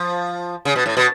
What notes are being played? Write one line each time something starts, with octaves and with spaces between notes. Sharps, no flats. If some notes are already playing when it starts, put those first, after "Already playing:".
Already playing: F3
C#3
B2
A2
B2